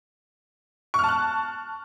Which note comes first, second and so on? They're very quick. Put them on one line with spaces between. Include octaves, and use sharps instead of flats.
C#6 F6 A5 F#6